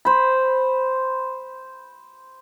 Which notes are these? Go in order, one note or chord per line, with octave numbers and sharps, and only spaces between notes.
C5 B5